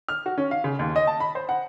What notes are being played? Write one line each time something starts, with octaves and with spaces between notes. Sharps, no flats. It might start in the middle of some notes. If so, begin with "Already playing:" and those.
F6
F#4
C#4
F5
C#3
D#2
D#5
A5
B5
C5
F#5